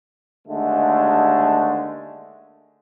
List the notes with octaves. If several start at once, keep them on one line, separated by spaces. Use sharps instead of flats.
D#2 D3 G#3 A3